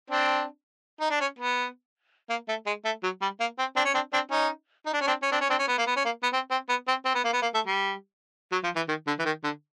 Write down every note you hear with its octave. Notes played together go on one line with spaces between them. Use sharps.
C4 D4
D#4
D4
C#4
B3
A#3
A3
G#3
A3
F#3
G3
A#3
C4
C4 D4
C#4
C4 D4
C4 D4
C#4 D#4
D#4
D4
C#4
C4 D4
C#4
C4 D4
C#4
C4 D4
C#4
B3
A#3
B3
C#4
A#3
B3
C4
C4
B3
C4
C4
B3
A#3
B3
A#3
A3
G3
F#3
F3
E3
D#3
D3
E3
D#3
D3